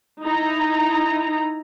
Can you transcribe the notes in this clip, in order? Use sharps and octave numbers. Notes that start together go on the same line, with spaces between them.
D#4 E4 A#5